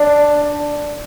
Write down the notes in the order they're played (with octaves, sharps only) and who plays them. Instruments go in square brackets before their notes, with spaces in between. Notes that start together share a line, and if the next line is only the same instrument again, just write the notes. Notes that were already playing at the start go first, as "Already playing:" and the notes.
Already playing: [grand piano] D4